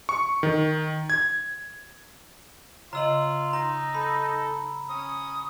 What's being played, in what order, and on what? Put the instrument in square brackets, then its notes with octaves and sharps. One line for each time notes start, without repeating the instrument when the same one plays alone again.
[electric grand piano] C#6
D#3
G#6
[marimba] C#3 D#5 [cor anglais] F4 [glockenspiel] A#5 E6 F#7
[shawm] D#4 [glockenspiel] A#5
[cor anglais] A4 [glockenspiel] B5
[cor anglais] C#4 [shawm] D#6